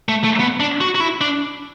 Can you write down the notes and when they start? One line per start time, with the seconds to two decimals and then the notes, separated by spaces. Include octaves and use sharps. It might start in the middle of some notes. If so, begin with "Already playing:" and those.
0.09 A3
0.24 A3
0.40 B3
0.60 D4
0.81 F#4
0.95 F#4
1.00 E4
1.21 D4